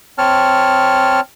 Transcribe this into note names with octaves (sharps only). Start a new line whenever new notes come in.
C4 C#5 A5 F6